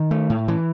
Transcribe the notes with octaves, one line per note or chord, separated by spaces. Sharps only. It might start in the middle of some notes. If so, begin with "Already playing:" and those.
Already playing: D#3
A3
A2
E3